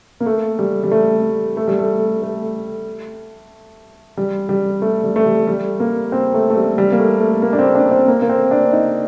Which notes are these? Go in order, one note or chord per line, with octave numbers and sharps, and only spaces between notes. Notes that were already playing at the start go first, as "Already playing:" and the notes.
A#3
A3
G3
G3
A3
A3
G3
A3
A3
G3
G3
A3
G3
A3
G3
G3
A#3
C4
A3
A3
G3
G3
A#3
A3
A3
A#3
D4
C4
D4
C4
A#3
A#3
C4
D4
D#4